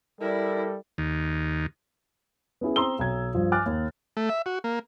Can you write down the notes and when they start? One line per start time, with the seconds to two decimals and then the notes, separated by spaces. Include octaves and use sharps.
0.21 G3 E4 A4 A#4 D5
0.98 D#2
2.61 B3 C#4 E4 G#4
2.76 C4 A#5 C6 D#6 E6 G7
2.99 B1 A#5 G#6
3.34 G2 F3
3.52 G#5 D6 F6 F#6 A6
3.66 D#2
4.17 A3
4.29 E5
4.46 F#4
4.64 A#3